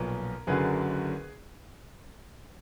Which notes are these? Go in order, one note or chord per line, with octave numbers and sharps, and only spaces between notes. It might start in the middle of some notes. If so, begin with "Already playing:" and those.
Already playing: B1 A#2 F3 B3 A#4
F#1 F#2 D3 F#3 G#4 B4